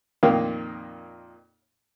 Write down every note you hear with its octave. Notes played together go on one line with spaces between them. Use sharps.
F2 A#2 D#3 A#3 F5